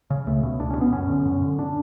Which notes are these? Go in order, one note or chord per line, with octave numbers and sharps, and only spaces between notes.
C#3
C#2 A3
B2
C#2 D4
C#4
B2
B3
F#2 C#4
D3
F#2
D3
D4